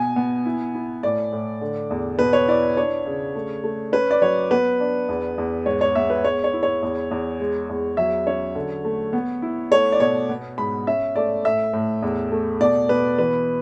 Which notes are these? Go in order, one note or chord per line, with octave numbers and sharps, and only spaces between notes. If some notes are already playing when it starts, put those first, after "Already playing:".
Already playing: B2 G#5
B3
E4
E4
A2 D5
A2
D3
E2
B2 B4
C#5
E4 D5
D4 C#5
C#3
A3
A3
C#4 B4
D5
F#3 C#5
B3 B4
D4
E2
E2
G#2 C#5
C#5
B3 E5
B4
G#3 C#5
C#5
E4
C#5
E2
E2
G#3
E2
F#3 E5
C#4 C#5
D3
A3
B3
E4
A3 C#5
D5
B2 C#5
B3
G#2 B5
C#4 E5
A3 D5
A2 E5
A2
E2
A3
B2 D5
B2 B4
E3 B4